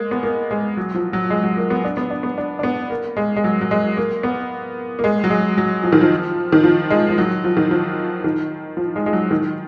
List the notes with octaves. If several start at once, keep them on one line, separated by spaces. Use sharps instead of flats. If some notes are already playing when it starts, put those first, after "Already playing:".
Already playing: G#3 A#3
B3
A#3
G#3
F#3
F3
F#3
G#3
F#3
A#3
B3
D4
B3
D4
B3
D4
D4
B3
A#3
G#3
G#3
F#3
F#3
G#3
A#3
B3
A#3
G#3
F#3
G#3
F#3
F3
D#3
F3
D#3
F3
G#3
F3
F#3
F3
D#3
F3
D#3
F3
G#3
G#3
F#3
D#3